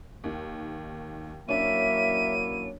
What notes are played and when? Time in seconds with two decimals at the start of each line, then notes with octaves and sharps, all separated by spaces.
0.24 D#2 D#3
1.49 F#3 A#3 C#4 D4 E4 E5 D#7